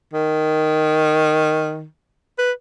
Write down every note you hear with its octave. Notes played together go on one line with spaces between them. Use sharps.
D#3
B4